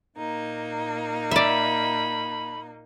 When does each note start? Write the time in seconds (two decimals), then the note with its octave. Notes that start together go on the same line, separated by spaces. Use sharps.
0.17 A#2 A#3 D#4
1.31 D5 E5 B5